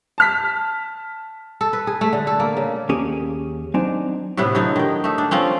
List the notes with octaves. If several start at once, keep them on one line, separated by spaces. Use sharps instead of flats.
A5 F6 B6
A4
B4
G#4
A3
D3
A4
A#3
C#3
D#2 A#3 C#4 G4 G#4
F#3 C4 D4 D#4 G#5
A2 C3 B3 E4
D3 F#3 D#4
D#3 G5
A3 D#4
D4
F3 C4 C#4